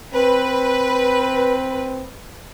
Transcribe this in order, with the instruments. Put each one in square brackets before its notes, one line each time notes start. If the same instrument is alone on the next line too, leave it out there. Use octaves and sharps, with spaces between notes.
[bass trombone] C4 [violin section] B4